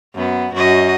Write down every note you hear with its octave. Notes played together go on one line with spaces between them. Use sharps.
F#2 B3
F#2 F#4 D#5